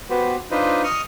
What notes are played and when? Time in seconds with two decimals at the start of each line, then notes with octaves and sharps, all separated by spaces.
0.10 B3 F#4 G4 B4 C5
0.51 D4 D#4 F4 B4 C5 D#5
0.84 D#5 C#6 D#6 F6